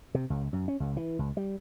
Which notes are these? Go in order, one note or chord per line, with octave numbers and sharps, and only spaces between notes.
C3
C#2
F#2
C#4
C#2
E3
C#2
G3